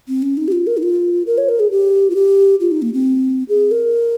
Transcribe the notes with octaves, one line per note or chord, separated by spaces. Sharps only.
C4
C#4
D#4
G4
F4
A#4
D#4
F4
A#4
C#5
A#4
G#4
G4
F4
G4
F4
D#4
A#3
C4
G#4
A#4